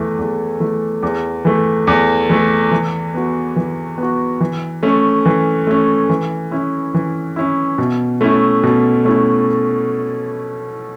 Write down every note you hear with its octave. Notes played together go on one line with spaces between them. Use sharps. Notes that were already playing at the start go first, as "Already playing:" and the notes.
Already playing: E2 E3 A3
E2
E3 A3
E2
E3 A3
E2
E3 A3
E3
B3 F#4
E3
B3 F#4
E3
A3 C#4
E3
A3 C#4
E3
C#4 E4
E3
C#4 E4
B2
A3 C#4 E4
B2
A3 C#4 E4